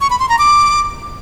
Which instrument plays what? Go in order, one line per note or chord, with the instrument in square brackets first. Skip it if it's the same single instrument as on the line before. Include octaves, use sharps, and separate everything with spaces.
[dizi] C#6
B5
C6
A#5
D6